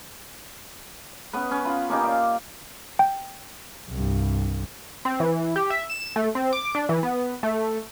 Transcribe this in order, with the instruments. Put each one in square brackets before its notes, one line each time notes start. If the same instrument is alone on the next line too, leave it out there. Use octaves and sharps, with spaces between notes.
[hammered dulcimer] B3 C#4 B4
C#4
F4 B5
A#3 C#4 D#4 G4
D5 F5
[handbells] G5
[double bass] C2 G2
[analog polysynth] C4
E3
G4
E5
E7
A3
C4
D6
D4
E3
B3
A3